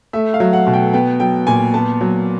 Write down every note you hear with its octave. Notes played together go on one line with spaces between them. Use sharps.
A3 E5
F5
F#3
F#5
B2
G5
B3 G5
F#3 G5
A#2 G#5
B3 A5
F#3